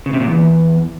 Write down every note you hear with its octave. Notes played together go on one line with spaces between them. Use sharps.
C#3
C3
A#2
E2